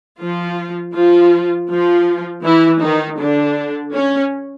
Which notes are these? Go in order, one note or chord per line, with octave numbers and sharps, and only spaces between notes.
F3 F4
F3 F4
F3 F4
E3 E4
D#3 D#4
D3 D4
C#4